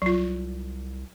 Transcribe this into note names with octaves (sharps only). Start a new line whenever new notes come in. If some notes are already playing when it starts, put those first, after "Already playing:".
C2 F#3 F4